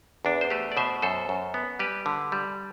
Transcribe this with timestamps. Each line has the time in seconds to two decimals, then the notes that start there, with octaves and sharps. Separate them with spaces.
0.25 E2 D4
0.41 C5
0.50 A3 G4 B4
0.72 D5
0.77 B2 C5 E5
1.02 F#2 A4 C5
1.29 F#2
1.54 B3
1.79 G3 G4 B4
2.06 D3
2.32 G3